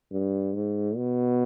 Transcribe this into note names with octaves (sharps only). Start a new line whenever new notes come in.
G2
G#2
B2